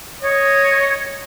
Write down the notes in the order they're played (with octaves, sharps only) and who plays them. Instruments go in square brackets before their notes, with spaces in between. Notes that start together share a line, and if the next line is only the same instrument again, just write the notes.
[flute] C#5 [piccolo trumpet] D#5